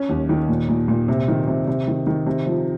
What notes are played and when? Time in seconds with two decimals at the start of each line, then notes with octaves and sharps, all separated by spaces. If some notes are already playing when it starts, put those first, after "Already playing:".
Already playing: C#4
0.09 D#2
0.29 D#3
0.49 A#2
0.69 A#2
0.88 A#2
1.08 C3
1.28 D#3
1.48 C3
1.67 C3
1.88 D#3
2.07 D#3
2.26 C3
2.46 F3